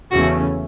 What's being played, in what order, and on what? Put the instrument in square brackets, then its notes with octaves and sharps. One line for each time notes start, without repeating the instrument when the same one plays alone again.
[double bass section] E2 C#3 E3 A3 C#4 [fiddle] F#4